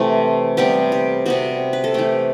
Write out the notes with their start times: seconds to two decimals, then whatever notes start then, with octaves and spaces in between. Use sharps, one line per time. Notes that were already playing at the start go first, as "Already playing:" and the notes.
Already playing: C3 E3 A3 G4
0.57 C3 G3 B3 G4
0.92 G4
1.26 C3 G3 B3 F#4
1.73 B4
1.84 A4
1.94 E3 A3 G4